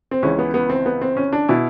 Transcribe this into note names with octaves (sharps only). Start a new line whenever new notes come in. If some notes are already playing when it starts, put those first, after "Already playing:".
C4
C#2 C#3 E3 C#4
B3
B3
C4
B3
C4
C#4
D4
B2 E4